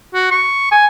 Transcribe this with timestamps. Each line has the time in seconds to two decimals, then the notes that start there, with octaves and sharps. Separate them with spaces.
0.14 F#4
0.31 C#6
0.72 G#5